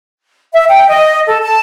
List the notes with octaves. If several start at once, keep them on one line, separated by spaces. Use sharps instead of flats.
E5
G5
D#5
A4
A5